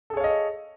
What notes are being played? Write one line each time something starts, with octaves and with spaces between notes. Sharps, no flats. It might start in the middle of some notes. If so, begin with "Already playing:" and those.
G#4 A4 C#5 D#5 F5